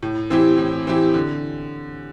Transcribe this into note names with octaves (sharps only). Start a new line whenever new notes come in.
A2
E3 C4 E4 G4
A2
E3 C4 E4 G4
D3